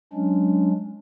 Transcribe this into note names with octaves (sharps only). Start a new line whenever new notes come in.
F#3 G#3 C#4 D4